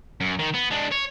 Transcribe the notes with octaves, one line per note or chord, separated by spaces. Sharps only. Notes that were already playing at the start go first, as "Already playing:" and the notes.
F#2
D#3
B3
G#3 D4
C#5